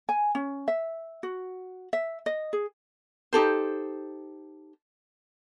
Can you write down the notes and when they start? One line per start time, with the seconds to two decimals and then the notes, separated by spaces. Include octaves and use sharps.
0.09 G#5
0.35 C#4
0.68 E5
1.23 F#4
1.93 E5
2.26 D#5
2.53 G#4
3.33 D#4 G4 A4 C5